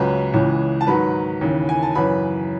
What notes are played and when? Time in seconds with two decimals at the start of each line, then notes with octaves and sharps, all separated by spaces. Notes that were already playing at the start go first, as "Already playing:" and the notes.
Already playing: C#2 C#3 F#3 B4 B5
0.34 C#2 C#3 E3
0.81 A5
0.87 G#2 D#3 F#3 B4 B5
1.41 D#2 C#3 E3
1.69 G#5
1.82 A5
1.95 F#2 C#3 E3 B4 B5